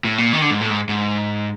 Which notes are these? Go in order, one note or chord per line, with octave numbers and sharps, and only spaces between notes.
A2
A#2
D#3
D3
G#2
A2
G#2
G#2